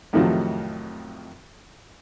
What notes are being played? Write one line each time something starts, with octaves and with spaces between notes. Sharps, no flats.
F2 A2 C3 D#3 F3 F#3